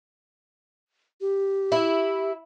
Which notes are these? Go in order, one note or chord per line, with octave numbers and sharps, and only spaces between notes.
G4
E4